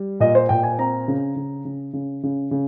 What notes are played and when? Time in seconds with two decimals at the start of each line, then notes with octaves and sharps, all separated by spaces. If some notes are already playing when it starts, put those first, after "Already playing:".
Already playing: G3
0.20 A#2 D#5
0.35 C5
0.49 A#2 G5
0.63 G#5
0.78 C4 A#5
1.08 C#3
1.36 C#3
1.65 C#3
1.93 C#3
2.23 C#3
2.51 C#3